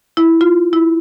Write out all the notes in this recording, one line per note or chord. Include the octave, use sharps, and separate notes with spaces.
E4
F4
E4